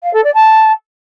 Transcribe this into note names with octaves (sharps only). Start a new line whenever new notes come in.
F5
A4
D5
A5